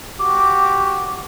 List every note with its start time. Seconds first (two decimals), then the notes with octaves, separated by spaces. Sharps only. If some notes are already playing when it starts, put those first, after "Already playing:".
0.20 F#4 G4 D6